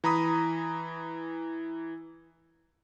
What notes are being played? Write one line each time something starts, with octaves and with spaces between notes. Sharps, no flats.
E3 A#5 B5 D#6